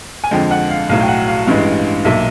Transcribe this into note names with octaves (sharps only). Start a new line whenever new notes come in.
G#5
F2 D3 F3 G#3 G5
F#5
F5
B1 A2 F#3 F5
G5
F#5
F5
A1 G2 E3 G#3
B1 A#2 F#3 E5